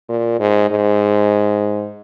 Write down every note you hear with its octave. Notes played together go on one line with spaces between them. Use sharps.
A#2
G#2
G#2